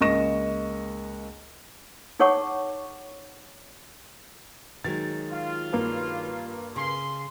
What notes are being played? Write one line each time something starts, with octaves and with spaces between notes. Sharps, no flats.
C#2 A#3 D#5 C#6 A#6 E7
D#4 G#4 C#5 F#5 C#6 D6
D#3 F#3 G#3 A6
F4
G2 A#3
C#3 C6